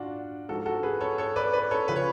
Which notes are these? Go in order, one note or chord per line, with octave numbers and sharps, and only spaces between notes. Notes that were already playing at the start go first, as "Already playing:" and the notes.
Already playing: D4 F4 F#4
G#2 F3 F#4 A4
F#4 A4
G#4 B4
A4 C#5
A4 C#5
B4 D5
B4 D5
A4 C#5
C#3 F3 B4
C#5